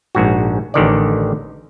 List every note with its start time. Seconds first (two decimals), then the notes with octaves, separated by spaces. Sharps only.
0.15 A#1 G#2 F#4
0.74 A1 D3 D#3 D5